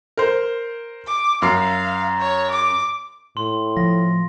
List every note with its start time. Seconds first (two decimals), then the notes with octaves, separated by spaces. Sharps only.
0.17 A#4 C5
1.07 D6
1.42 F#2 F5 C7
2.19 C#5
2.50 D6
3.37 A2 C6
3.77 F3 A#6